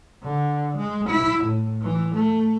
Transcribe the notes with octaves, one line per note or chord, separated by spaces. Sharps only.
D3
G#3
E4
A2
E3
A3